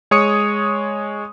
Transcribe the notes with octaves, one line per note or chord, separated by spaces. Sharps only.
G#3 C#5 C#6 D#6 C#7